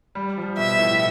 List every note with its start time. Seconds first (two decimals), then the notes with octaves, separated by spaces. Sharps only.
0.15 G3
0.38 F3
0.58 B2 E5
0.79 A2